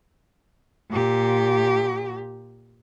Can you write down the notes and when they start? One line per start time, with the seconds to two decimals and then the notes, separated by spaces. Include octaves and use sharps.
0.91 A#2 G4